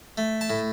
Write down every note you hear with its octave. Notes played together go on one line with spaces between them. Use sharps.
A3
A5
A2